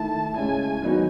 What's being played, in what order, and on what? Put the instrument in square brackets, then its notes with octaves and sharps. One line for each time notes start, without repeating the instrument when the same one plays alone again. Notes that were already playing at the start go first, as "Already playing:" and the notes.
Already playing: [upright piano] D#3 A3 E4 [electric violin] A5
[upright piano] C#3 G#3 C#4 E4 [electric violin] G#5
[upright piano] D#3 F#3 B3 D#4 F#4